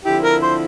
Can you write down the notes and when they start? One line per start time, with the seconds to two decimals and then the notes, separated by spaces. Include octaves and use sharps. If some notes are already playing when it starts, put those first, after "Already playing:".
0.05 D3 F3 C4 E4 G4
0.23 A#4
0.42 C5